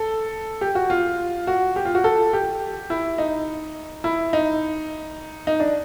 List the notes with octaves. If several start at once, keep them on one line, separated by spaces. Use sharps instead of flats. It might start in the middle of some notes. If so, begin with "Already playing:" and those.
Already playing: A4
G4
F#4
F4
F#4
G4
F4
F#4
A4
G4
E4
D#4
E4
D#4
D#4
D4